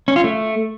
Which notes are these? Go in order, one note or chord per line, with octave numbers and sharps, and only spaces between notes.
C#4
F4
A3